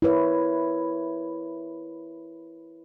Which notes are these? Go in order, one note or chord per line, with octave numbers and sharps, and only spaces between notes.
E4 A#4 B4 C#5